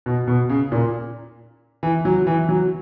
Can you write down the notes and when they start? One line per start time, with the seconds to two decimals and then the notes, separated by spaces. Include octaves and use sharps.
0.06 B2
0.28 B2
0.49 C#3
0.72 A#2
1.83 E3
2.05 F#3
2.27 E3
2.49 F#3